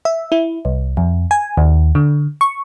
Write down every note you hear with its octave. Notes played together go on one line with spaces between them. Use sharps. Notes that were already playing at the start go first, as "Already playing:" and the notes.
E5
E4
C2
F2
G#5
D#2
D3
C#6